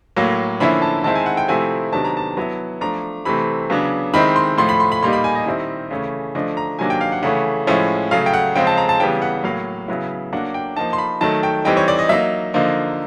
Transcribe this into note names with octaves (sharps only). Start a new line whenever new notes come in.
A2 F#3 A#3
D3 F3 A#3 C#4 E4 B5
A5
D#3 G#3 C4 E4 A5
G#5
F#5
G5
C3 F3 A3 C4 E4 G#5
C3 D#3 F#3 B3 D4 A5
A#5
A5
F#3 B3 E4
F3 A3 D4 A#5
C3 E3 A3 C4 B5
C#3 F#3 B3 D4
D#3 G#3 C4 E4 B5
C6
A2 F3 A3 C6
B5
C6
B5
A#2 G3 A#3 D#4 C6
B5
G#5
D#5
D#3 G3 C4 E4
C#3 E3 A3 C#4
D3 F3 A3 D4 D#5
A#5
C3 D#3 F#3 A#3 D4 G#5
G5
F5
F#5
C#3 E3 A3 C#4 F#5
A2 F3 G#3 C#4 E4
C#3 F#3 A3 F5
G5
F#5
C#3 F3 G#3 C4 G5
A5
A#5
A5
C#3 E3 G3 B3 G5
F#5
A2 F#3 A#3 F5
C#3 F#3 B3 E4
F#3 A#3 D4 F#5
G5
F3 A#3 D#4 A5
C6
B5
D#3 F#3 A3 A5
G5
E3 G3 C4 D#4 G5
C#5
D5
D#5
F#3 A#3 D#4 E5
D3 F3 A#3 D#4